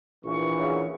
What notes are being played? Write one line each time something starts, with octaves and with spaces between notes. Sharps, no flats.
A#1 E3 C#6
F#2 C#3